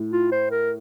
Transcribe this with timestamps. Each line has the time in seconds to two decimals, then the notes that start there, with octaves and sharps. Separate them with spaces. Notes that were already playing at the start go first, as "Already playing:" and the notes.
Already playing: A2
0.12 F4
0.32 C5
0.51 A#4